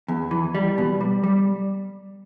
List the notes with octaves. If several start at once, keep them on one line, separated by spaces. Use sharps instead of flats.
E2
E3
G3
B2
G3
G3